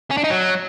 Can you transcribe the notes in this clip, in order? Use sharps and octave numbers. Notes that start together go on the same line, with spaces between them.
C#4
D4
D#4
F#3